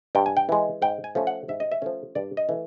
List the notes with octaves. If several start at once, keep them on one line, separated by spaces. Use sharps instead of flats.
G2 G5
G#5
G5
E3 G#3
G#2 G5
G#5
F3 A3 C#4
F#5
G#2 E5
D#5
E5
F3 A3 C#4
G2 D5
D#5
E3 A3